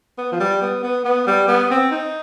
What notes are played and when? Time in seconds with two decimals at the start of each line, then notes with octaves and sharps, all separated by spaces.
0.18 B3
0.32 F3
0.40 G3
0.61 B3
0.83 B3
1.05 B3
1.27 G3
1.48 B3
1.70 C4
1.91 D#4